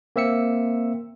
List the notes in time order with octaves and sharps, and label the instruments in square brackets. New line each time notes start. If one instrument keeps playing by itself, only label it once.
[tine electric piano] A#3 C4 E5 E6 C#7